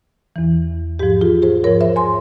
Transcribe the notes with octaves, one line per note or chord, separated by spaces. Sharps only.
E2 E3
G#2 F3 G4
F4 G#4
G#4 C5
G#2 F3 A#4 C#5
C5 E5
G#5 C6